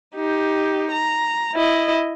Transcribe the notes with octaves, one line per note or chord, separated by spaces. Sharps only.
D#4 G4
A#5
E4 D#5